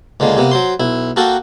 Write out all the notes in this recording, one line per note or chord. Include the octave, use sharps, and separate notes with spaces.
C#2 D3 G#3 A#3
C3 A#3 B3
F#3 C5 C6
B1 E4
A#3 F#4 A4 A#4 F#5 G5